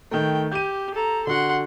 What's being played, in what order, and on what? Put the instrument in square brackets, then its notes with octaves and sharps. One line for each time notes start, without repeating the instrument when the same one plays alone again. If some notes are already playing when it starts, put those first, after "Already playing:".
[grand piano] D#3 A3 [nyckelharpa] G5
[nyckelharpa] G4 [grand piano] G6 D#7
[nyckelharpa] A4 A#5
[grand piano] D3 F#4 [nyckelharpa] F#5 C6